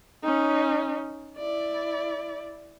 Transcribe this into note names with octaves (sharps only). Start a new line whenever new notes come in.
C#4 D#4
E4 D5